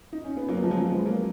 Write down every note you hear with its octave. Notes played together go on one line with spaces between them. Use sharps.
D#4
C#4
B3
F#3 A#3
F3 G#3
F#3
F3 G#3
G#3 B3
F#3 A#3